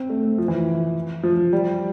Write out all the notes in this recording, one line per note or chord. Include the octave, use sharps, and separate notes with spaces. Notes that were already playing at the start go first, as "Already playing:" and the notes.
Already playing: C4
A3
F3
E3
F3
G3